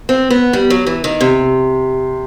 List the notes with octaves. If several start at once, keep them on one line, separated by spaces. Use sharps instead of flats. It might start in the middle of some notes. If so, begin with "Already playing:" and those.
C4
B3
G3
F#3
E3
D#3
C3